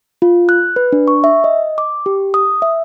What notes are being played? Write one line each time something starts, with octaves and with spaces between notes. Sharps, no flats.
F4
F#6
B4
D4
C#6
E5
D#5
D6
G4
D#6
E5